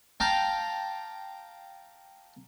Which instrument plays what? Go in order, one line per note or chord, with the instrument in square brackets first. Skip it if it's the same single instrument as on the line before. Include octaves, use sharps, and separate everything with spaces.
[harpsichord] F5 G5 A5 A#5 D6